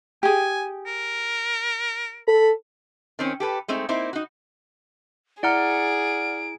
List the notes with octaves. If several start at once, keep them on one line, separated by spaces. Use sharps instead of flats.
G4 G#4 G#5
A#4
A4 B5
D#3 C4 C#4
G4 A4 B4
G#3 A3 C4 D#4
A#3 C4 D#4 E4 C5
D#4 F#4
E4 G#4 D5 F#5 A#5 F6 D7